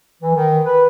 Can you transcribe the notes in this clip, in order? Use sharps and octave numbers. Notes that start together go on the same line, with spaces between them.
E3
D#3
B4